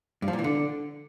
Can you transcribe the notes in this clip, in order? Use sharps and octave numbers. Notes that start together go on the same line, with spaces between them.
G2
F3
A#2
E3
D3